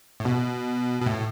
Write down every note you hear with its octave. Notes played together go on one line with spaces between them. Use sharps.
A2
B2
B2
A2